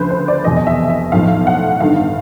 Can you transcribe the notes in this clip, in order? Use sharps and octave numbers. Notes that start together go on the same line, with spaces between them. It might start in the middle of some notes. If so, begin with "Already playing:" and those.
Already playing: D2 C#3 F3 B4 C5
C5
D5
F1 E2 B2 D#5
D#5
E5
E5
B1 A2 F3 F5
F#5
G1 G2 D#3 F5